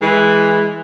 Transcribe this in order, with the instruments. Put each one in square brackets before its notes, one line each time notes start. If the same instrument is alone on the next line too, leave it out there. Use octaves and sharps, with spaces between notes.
[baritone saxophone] E3 [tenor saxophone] G#3